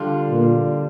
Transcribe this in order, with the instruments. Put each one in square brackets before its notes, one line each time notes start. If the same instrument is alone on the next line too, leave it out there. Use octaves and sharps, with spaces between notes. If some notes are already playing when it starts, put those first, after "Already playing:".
Already playing: [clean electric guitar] D3 G3 D4 F4
[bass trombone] A#2